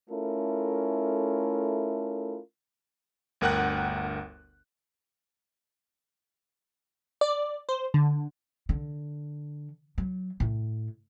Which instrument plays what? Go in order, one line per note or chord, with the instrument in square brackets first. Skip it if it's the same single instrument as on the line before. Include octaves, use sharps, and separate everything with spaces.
[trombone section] A3 C#4 E4 F4 A4 A#4
[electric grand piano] G1 D2 A#4 F#5 G5 F#6
[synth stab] D5
C5
D3
[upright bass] D3
F#3
A2